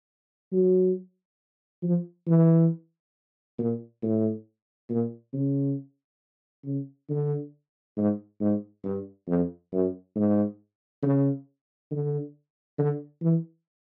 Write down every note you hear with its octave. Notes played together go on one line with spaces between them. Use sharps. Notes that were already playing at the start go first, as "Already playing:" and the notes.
F#3
F3
E3
A#2
A2
A#2
C#3
C#3
D3
G#2
G#2
G2
F2
F#2
G#2
C#3
D3
D3
E3